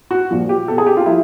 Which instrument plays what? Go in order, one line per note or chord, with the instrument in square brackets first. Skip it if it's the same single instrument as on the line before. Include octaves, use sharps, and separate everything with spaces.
[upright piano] F#4
A#2 F3
G4
B2 A4
G#4
G4
F4
F3 E4